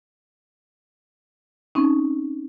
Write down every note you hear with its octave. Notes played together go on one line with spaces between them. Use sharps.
C4 C#4 D#4